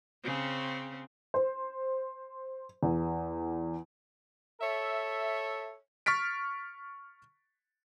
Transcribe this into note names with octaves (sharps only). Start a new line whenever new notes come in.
C#3 C4 C#4
C5
E2
A4 C#5 E5
C#6 F6 A6 B6 D7